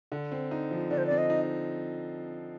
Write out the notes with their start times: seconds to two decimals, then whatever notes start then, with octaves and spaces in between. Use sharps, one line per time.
0.12 D3
0.31 C4
0.51 D#4
0.71 F3
0.91 D3 D5
0.98 C5
1.07 C4 D5
1.18 D#5
1.30 D#4